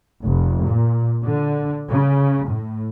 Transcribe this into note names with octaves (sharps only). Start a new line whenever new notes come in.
F1
A#2
D3
C#3
A2